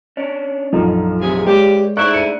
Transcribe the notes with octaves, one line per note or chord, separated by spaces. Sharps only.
C#4 D4
A#1 F#2 D#4 F4 A4
A2 C3 D#3 G#4
G#3 G4 B4 C#5 D5 G5
G#2 A3 D4 E4 D5 C#6 F#6
C#7 D#7